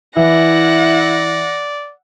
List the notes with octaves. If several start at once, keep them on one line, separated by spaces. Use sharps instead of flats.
E3 E4 D5 F#5 A#6